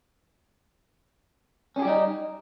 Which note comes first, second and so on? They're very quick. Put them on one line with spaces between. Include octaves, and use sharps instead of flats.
C#4 G#4 G4 G3 D#4